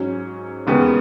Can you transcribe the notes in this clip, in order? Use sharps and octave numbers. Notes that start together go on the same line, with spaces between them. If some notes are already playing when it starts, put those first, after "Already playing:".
Already playing: G#2 F#3 C#4
E1 D#2 C#3 G#3 B3